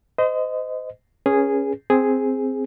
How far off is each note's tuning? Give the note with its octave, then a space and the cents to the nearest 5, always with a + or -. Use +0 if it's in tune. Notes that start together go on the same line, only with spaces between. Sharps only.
C5 -35 D#5 +0
C#4 +0 G#4 -5 B4 -35
C4 +0 G#4 +0